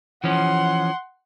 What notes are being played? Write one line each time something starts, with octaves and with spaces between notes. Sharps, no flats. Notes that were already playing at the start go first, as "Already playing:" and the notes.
E3 F3 C#4 F#5 C6